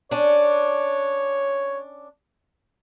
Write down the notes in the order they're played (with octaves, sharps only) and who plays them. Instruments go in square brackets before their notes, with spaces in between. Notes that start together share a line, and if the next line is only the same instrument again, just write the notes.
[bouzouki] C#4 D4 [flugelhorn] C#5